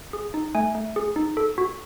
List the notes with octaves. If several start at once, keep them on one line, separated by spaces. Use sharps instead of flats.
G#4
D#4
A3 G#5
A3
G#4
D#4
A4
F#4